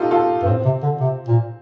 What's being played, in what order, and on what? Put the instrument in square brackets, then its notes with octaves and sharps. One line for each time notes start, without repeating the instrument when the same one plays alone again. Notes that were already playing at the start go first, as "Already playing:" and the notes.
Already playing: [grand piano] D#4 F4 G4 A4
F4 A4
[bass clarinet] G2
[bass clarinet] A2 [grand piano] C4
[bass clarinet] C3
D3
C3
A#2